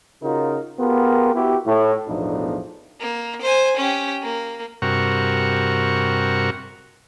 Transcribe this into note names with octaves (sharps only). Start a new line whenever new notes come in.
C#3 D#4 F4 F#4 A#4
B3 F4 G4 G#4 A#4
B3 E4 F#4 G4
A2
B1 E2 A2 F3 D4 D#4
A#3
C5 G#5
C#4 G4
A#3
G2 C3 F#4 A#4 C#6